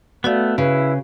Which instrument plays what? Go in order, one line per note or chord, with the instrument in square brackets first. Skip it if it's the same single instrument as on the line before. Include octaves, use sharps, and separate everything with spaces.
[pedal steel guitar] A3 B3 [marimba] F#4 D5 F5
[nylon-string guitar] C#3 [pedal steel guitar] E4 [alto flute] B4